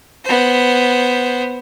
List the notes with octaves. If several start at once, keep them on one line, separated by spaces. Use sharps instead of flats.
B3 C5